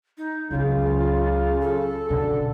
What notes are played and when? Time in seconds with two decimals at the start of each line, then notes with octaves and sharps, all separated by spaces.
0.18 D#4
0.51 C#2 C#3 F#3 F4
1.61 A4
2.10 B2 D3